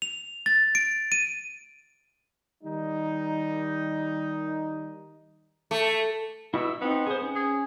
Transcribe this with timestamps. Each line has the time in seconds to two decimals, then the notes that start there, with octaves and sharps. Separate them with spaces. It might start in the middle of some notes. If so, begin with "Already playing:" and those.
0.02 F7
0.46 A6
0.75 D7
1.12 D#7
2.63 D#3 G3 D#4
5.71 A3
6.54 B2 E4 E6
6.82 B3 C4 D#4
7.07 G#4 C5
7.22 C#4
7.36 G#4